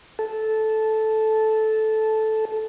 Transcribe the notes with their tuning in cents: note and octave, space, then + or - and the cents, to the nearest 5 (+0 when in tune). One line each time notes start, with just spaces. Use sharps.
A4 -10